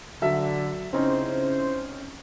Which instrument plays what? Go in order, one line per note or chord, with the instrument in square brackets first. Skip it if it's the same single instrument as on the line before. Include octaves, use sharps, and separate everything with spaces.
[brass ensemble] D3 [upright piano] F#3 A4 E5
[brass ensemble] C#3 E4 C5 [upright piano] C4 C#4 D#4